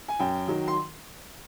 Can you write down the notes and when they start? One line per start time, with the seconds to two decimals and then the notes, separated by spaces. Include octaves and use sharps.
0.08 G#5
0.19 F#2 G5
0.48 D#3 F#3
0.67 C6